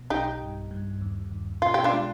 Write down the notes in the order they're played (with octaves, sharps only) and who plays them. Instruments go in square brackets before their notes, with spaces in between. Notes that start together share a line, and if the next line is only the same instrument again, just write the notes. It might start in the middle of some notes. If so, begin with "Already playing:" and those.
Already playing: [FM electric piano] B2
[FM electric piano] B1 [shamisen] D#4 G4
[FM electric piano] G2
G2
D#2
D#2
[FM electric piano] B2 [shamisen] F4
[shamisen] G4
D4 F4
[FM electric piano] G#3